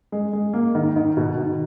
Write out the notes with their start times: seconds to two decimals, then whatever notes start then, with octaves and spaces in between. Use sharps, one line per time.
0.12 G#3
0.33 G#3
0.53 A#3
0.75 D#3
0.96 D#3
1.17 B2
1.37 D#3